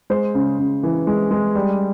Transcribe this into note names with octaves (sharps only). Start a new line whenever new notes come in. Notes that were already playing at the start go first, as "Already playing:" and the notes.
G#3 C5
C#3
C#3
E3
G#3
G#3
G3